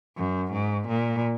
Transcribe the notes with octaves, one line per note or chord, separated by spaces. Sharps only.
F#2
G#2
A#2